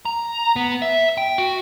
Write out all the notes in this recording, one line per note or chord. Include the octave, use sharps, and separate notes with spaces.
A#5
B3
E5
G5
F#4